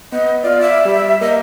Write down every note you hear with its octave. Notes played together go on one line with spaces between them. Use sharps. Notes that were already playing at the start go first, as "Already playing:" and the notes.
B3 D#5
F4 D5
E5
G3
A#3 D#5